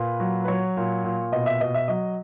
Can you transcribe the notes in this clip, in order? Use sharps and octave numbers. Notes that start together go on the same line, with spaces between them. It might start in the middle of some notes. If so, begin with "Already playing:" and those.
Already playing: A#2 B4
F#3
B4
F#3 C#5
A#2
A#2
B2 D#5
E5
B2 D#5
E5
F#3 D#5